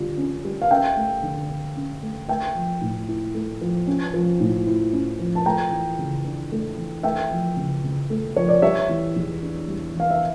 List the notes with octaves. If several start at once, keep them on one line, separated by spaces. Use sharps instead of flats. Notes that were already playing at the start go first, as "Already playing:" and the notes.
Already playing: D3 G3 F4
C#4
G3
F5
C#4 E5 G5
A3
D3
D3
C#4
A3
A3 E5 G5
F3
A2
E4
A3
F3
C#4
F3
A2
E4
C#4
F3
A5
A3 G5 A#5
E3
C#3
D4
A3
E3
A3 E5 G5
F3
C#3
C#3
A3
F3 C#5
D5
G3 C#5 E5
E3
E2
D4
G3
E3 F5
E5